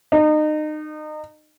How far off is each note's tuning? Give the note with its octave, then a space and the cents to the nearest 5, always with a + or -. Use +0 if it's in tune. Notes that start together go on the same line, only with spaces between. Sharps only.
D#4 -30